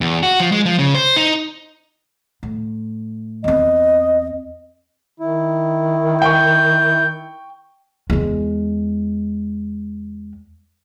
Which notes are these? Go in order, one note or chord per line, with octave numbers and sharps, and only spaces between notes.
E2
F#4
F3
G#3
F3
C#3
C5
D#4
A2
E2 C4 D#5
D#3 E4
G5 C#6 G6
E2 G#3